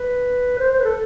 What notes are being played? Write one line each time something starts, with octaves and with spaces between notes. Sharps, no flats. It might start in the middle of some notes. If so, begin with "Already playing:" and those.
Already playing: B4
C5
C5
B4
A4